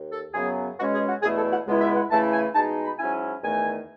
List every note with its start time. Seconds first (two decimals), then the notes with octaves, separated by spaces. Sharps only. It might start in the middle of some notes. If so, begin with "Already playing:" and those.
Already playing: D#2
0.12 A4
0.34 F#2 C#3 F#3 B3 G#4
0.78 B2 G#3 C#4 F#4
0.93 G#4
1.08 F#4
1.22 E2 B2 A3 E4 G#4
1.37 A4
1.51 F#5
1.66 C#2 B2 G#3 B3 E4
1.81 E5
1.96 F#5
2.11 C#3 E3 A3 E4 A5
2.33 G#5
2.54 B2 G#3 D#4 A5
2.84 B5
2.98 G#2 F#3 C#4 E4 G#5
3.43 E2 D#3 A3 G#5